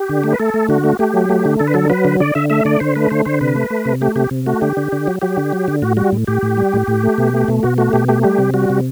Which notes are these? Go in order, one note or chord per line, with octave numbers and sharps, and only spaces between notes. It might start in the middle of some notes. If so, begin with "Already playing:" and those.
Already playing: G4
D3
A3
B4
A3 A4
A3
D3 F#4
A3
A3 G4
F#3
A3
D3
D3 A4
B4
F#3 A4
F#3 B4
D3
D3 D5
D3 E5
A3 E5
D3 D5
D3 C5
A3 B4
D3 C5
D3 C5
C3 B4
A3
A3
C3
A3 G4
C3 G4
C3
A3 F#4
D3 G4
D3
D3
F#3
F#3 G4
D3
F#3
D3
A2 F#4
G3 F#4
A2
A2 G4
A2
G3
A2
A2
A3
B2
A3
B2
B2 F#4
A3 F#4
B2 G4
A3 G4
G3 G4
C3
G3 F#4
C3